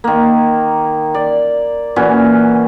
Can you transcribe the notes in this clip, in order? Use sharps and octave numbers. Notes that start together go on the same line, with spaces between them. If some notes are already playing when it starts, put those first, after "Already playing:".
D#3 A#3
D5
A#2 E3 C#4 F#4